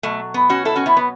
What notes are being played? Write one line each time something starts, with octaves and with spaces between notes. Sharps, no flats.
B2 F#3 A3
B3
C#4 F#4
E4 A4
C#4 F#4
B3 E4
B3